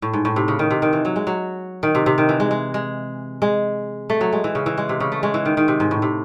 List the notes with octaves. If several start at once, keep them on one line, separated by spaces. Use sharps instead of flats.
A2
G#2
A2
C3
C#3
D#3
C3
D#3
E3
F#3
G#3
F#3
D#3
C3
C3
D#3
E3
G#3
G#3
G#3
G#3
A3
F#3
G#3
E3
C#3
E3
G#3
C3
C#3
A3
G#3
E3
D#3
D#3
C3
G#2
A2
C3